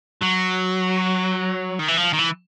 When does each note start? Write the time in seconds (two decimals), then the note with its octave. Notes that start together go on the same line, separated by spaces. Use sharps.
0.22 F#3
1.79 D#3
1.88 E3
1.97 F3
2.13 D#3
2.19 E3